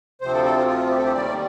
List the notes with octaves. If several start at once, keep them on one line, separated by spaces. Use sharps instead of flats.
D2 C3 F3 C4 C5
A4
A4
F4
F4
G4
A4
G4
D#2 D#3 G3 D5